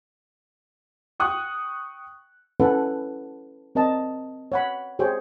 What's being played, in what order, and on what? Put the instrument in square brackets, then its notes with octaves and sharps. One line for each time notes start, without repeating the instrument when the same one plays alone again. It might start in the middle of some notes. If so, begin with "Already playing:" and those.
[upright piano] G5 C#6 D#6 F#6
[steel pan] C#4 E4 A4 B4 C#5 F#5
C4 A#4 D#5 A5
C#5 F#5 B5
G4 G#4 C5 C#5 G5